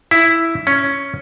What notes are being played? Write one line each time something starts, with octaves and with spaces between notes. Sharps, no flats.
E4
C#4